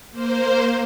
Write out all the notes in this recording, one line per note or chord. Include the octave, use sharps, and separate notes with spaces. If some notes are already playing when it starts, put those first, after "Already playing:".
A#3 C5